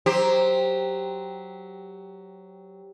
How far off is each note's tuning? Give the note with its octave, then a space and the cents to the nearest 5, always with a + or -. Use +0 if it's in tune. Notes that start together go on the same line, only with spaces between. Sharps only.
F#3 +10 G4 +0 C5 +0